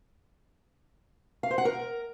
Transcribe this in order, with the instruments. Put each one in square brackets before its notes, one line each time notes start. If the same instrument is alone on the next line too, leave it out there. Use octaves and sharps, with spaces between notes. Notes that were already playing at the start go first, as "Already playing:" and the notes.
[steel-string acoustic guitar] F5
C5
F#5
A#4